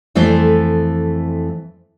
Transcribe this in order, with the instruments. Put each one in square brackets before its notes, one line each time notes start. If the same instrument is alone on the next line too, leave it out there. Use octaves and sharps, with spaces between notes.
[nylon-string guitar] F2 E3 A3 A4 C5